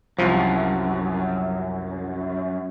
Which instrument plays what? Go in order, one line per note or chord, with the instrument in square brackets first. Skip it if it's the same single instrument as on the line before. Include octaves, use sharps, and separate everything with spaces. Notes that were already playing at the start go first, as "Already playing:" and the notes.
[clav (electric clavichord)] C2 F3 [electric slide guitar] F#2